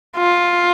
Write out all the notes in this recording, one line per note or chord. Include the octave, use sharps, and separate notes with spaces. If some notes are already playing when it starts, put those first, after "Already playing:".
F4